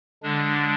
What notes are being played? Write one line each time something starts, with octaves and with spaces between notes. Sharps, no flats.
D3 G#3 D4